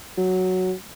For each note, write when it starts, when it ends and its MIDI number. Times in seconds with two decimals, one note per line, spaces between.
0.18 0.73 54